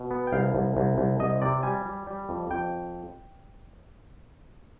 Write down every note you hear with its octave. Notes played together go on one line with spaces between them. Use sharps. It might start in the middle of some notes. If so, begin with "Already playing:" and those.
Already playing: B2
B3
G5
C2 F5
C2
C2
C2
C2 D#5
C3 D5
G3 G#5
G3
G3
F2
F2 G5